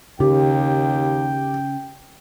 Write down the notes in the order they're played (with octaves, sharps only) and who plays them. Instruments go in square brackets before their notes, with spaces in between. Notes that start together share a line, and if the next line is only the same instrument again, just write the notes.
[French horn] D#2 [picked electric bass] C#3 [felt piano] G4 [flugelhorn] G5